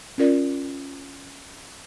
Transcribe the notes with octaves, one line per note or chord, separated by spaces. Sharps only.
C#4 F4 A#4 D5